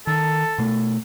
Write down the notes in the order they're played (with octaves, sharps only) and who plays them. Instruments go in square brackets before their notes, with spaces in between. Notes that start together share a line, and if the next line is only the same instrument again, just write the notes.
[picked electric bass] D#3 [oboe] A4
[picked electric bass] B2 A3